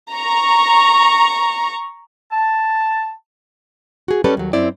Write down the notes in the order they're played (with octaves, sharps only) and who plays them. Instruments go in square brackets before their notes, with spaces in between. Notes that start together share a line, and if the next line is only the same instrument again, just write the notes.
[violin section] A#5 C#6
[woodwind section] A5
[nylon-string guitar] F#4 G#4
G3 C#4 A4 B4
D#2 F#3
F#2 C4 E4 D5